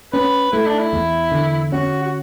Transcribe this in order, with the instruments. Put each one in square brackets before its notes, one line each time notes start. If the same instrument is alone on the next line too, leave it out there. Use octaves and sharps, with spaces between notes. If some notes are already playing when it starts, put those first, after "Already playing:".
[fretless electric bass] C#4 [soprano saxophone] B4
[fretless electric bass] A3 [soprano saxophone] E4
[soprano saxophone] D4
E4
[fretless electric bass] E2
D3
[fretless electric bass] C#4 [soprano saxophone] F#4
[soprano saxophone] F#4